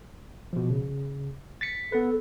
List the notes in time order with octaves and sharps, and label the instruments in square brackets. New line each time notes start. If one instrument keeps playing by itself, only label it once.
[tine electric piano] B2 F3
C#3
A6 B6 C#7
[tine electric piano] B3 B4 [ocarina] A4